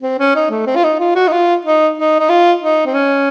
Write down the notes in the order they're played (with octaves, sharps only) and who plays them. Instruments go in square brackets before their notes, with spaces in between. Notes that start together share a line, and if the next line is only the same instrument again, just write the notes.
[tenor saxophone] C4
C#4
D#4
A3
C4
F4
D#4
F4
F#4
D#4
F4
D#4
D#4
D#4
F4
D#4
C4
C#4